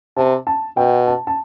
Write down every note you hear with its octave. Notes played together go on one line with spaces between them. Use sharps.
C3 A5
A5
B2 G5
A5
A5